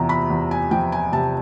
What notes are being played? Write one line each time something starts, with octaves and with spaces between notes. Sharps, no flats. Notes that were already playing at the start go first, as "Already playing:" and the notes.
Already playing: E2 C3 F3 A#5
B5
E2
G#5
F3 G5
G#5
C3 A5